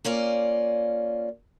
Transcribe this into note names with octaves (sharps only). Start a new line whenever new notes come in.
A#3 C#4 F4 D5